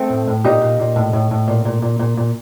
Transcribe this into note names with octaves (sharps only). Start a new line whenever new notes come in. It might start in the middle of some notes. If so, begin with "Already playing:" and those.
Already playing: A3 C4
A2
A2
A#2 D#4 G4
A#2
A#2
A2
A2
A2
A#2
A#2
A#2
A#2
A#2